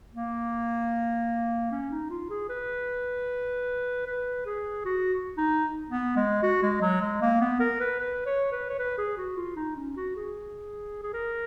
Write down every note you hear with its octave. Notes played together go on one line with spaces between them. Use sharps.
A#3
C#4
D#4
F4
G#4
B4
B4
G#4
F#4
D#4
B3
G#3
F#4
G#3
F#3
G#3
A#3
B3
A#4
B4
B4
C#5
B4
C#5
B4
G#4
F#4
F4
D#4
C#4
F#4
G#4
G#4
A#4